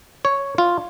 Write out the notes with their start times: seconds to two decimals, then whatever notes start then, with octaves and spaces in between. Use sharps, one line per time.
0.25 C#5
0.58 F4